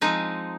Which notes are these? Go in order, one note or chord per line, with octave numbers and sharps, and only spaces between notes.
F3 G#3 C4 D#4